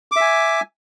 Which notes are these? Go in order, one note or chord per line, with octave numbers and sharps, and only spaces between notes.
E5 G#5 D6